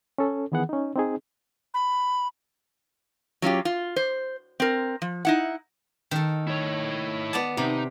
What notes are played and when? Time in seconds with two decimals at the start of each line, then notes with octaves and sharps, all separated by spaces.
0.18 C#4 A4
0.52 D#3 E3 B3 G#4 F#5
0.69 C#4 D#4
0.96 C4 D#4 G#4
1.74 B5
3.42 F#3 C#4 F4 G4
3.65 F4
3.96 C5
4.60 C4 A#4
5.02 F3
5.25 D#4 E4 F#5
6.11 D#3 A4
6.47 E4 C#5
7.33 B3 D5 A5
7.57 C3 D#4 A#5